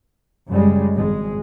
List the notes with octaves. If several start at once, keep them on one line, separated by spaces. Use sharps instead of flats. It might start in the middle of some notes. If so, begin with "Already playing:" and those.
F#2 C#3 G3 G#3
G#1 G#3